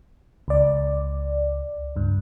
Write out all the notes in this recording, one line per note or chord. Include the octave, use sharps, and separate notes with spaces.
C#2 D5
C#2 G2